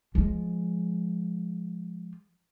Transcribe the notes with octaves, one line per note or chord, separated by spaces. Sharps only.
F3 G#3